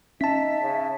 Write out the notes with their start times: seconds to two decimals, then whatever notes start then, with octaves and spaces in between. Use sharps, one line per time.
0.21 C#4 D#4 E5 A5 B6
0.61 C#3